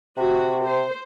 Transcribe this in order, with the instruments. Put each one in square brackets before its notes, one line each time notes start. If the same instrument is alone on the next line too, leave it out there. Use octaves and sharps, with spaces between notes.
[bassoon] C3 [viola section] F#4
[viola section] C5